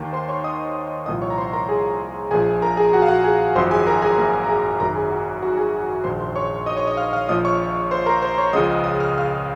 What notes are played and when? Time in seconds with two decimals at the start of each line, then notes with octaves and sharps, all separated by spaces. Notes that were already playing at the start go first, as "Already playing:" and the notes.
Already playing: D#2 D#3
0.13 C5 C6
0.28 C#5 C#6
0.44 D#5 D#6
1.06 C2 A#2 F3 D#5 D#6
1.22 C#5 C#6
1.30 A#5
1.38 C5 C6
1.53 A#4 A#5
1.69 G#4 G#5
2.31 A#1 A#2 F3 G#4 G#5
2.62 A#4 A#5
2.77 G#4 G#5
2.93 F#4 F#5
3.02 F5
3.08 F#4 F#5
3.24 G#4 G#5
3.55 G#1 F#2 F3 C5 C6
3.71 G#4 G#5
3.87 A#4 A#5
4.02 G#4 G#5
4.18 A#3 A#4
4.44 A#5
4.49 G#4 G#5
4.80 G#1 F#2 D#3 A#4 A#5
4.95 G#4 G#5
5.11 F#4 F#5
5.42 F#4 F#5
5.57 G#4 G#5
6.04 A#1 G#2 D#3 C5 C6
6.20 C5 C6
6.36 C#5 C#6
6.66 D#5 D#6
6.76 C#5 C#6
6.87 D#5 D#6
6.97 F5 F6
7.13 F5 F6
7.29 A#1 A#2 F3 D#5 D#6
7.45 C#5 C#6
7.91 C5 C6
8.06 A#4 A#5
8.22 C5 C6
8.38 C#5 C#6
8.53 C#2 C#3 F3 D#5 D#6
8.84 D#5 D#6
9.00 F6
9.09 D#6
9.18 F5 F6